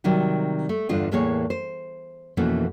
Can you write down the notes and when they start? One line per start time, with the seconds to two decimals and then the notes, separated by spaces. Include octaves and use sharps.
0.04 C3 D#3 F#3 G3
0.69 A3
0.89 E2 G2 D3 F4 D#5
1.11 E2 A2 E3 A#3 G#4 C#5
1.50 C5
2.37 F2 B2 E3 A3 A#3 C#4